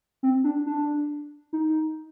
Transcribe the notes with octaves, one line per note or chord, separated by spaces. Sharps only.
C4
D4
D4
D#4